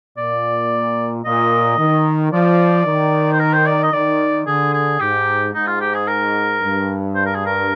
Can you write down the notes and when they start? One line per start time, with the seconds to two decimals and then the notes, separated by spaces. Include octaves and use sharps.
0.17 A#2 D5
1.24 A#2 D#5
1.78 D#3
2.32 F3 D5
2.86 D#3
3.32 C5
3.39 A#4
3.53 C5
3.66 D5
3.83 D#5
3.93 D#3 D5
4.47 D3 G#4
4.73 G#4
5.00 G#2 G4
5.54 G#2 D#4
5.67 F4
5.80 G4
5.94 G#4
6.08 A#4
6.61 G2
7.15 C5
7.25 A#4
7.35 G#4
7.46 A#4